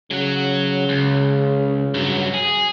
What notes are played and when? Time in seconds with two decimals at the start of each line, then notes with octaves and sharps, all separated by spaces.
0.11 C#3 F#3 F#4
0.89 C#2
1.94 G2 F#3
2.34 G#4